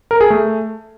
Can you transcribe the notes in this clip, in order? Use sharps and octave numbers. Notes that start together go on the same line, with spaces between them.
A#4
G#4
A3